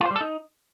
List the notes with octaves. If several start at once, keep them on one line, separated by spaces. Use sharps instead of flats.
F4
C5
G3
A4
D#4